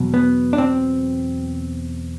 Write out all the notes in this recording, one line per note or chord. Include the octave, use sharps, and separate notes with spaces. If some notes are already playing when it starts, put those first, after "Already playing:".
Already playing: E2 B2 F#3
B3
D4
C4